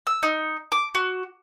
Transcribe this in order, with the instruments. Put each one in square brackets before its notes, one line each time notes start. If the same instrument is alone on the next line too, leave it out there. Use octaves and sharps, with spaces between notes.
[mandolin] E6
D#4
D6
F#4